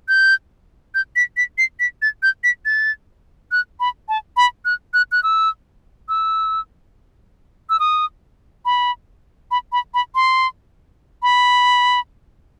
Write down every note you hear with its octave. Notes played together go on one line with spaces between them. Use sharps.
G6
G6
B6
B6
C7
B6
A6
G6
B6
A6
F#6
B5
A5
B5
F#6
F#6
F#6
E6
E6
E6
D#6
B5
B5
B5
B5
C6
B5